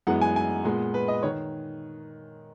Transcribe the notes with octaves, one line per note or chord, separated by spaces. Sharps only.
F#2 E3 G#3 B3 F#5
G#5
G#5
A#2 G#3 B3
B4
D#5
D#3 C#5